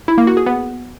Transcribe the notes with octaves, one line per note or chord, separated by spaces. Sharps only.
E4
A#3
F#4
G#4
B3